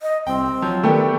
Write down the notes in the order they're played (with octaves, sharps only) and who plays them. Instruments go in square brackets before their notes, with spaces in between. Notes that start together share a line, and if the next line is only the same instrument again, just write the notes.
[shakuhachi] D#5
[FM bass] C2 [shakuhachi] C4 [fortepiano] G5
[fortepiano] F3 [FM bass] F#3
[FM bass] D#3 [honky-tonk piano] A3 G5 [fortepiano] B3 D4 G4